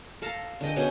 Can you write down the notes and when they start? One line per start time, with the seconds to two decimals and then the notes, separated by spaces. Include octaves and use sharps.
0.22 A4 F5 A5 A#5
0.61 D3 G#3 D#5 G5
0.76 B2 C#4 G#4 F#5